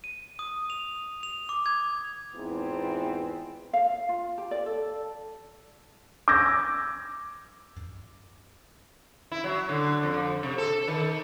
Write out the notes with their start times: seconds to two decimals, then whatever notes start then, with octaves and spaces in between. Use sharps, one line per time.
0.04 D#7
0.39 D#6
0.70 F7
1.23 F7
1.49 D6
1.66 G#6
2.35 E2 G#2 B3 C4 E4 F4
3.73 F5
4.09 F4
4.38 G4
4.51 D5
4.66 A4
6.28 D6 E6 G6 G#6 A#6
9.32 E4
9.44 F#3
9.69 D3
10.03 F2
10.43 C3
10.58 A4
10.88 D#3